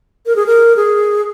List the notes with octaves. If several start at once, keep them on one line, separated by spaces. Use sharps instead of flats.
A#4
G#4
A#4
G#4